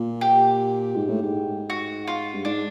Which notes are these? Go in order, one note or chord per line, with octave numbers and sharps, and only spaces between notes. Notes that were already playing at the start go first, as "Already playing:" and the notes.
Already playing: A#2
G4
G#2
A2
G#2
F#4
F4
G2
G#2 D4